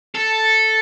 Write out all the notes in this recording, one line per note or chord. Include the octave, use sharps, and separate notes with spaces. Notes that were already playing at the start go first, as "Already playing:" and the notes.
A4